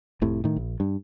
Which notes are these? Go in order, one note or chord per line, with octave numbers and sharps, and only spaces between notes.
F1 A2 C3
A2 D#3
A#1
G2